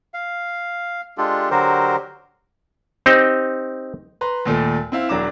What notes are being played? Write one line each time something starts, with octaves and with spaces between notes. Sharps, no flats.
F5
G#3 D4 F4 G4 A4
D3 F#3 F#4 G4 A#4 C5
C4 D#4 G4 C5
B4 A#5 C6
D#2 A#2 A3
C4 E4 F5
E1 F#3 D4 A#5 D6 E7